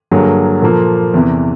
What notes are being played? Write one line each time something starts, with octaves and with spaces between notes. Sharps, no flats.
G2 D3 F#3 A#3 G#4
A#2 F3 A#3 A4
E2 C3 E3